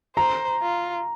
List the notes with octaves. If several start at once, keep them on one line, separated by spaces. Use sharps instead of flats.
C5 A#5
F4